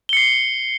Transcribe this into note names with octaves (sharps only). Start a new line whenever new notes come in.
C7 C#7 G7